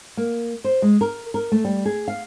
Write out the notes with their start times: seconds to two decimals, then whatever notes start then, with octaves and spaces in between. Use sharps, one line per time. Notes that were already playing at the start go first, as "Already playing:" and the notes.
0.17 A#3
0.64 C5
0.82 G#3
1.01 A#4
1.34 A#4
1.52 A3
1.65 G3
1.86 G#4
2.08 F5